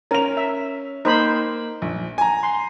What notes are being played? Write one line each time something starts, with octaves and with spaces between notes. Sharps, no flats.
C#4 A#4 F7
E5
A#3 D#4 C5 B5
A#1
G#5 A#5
C6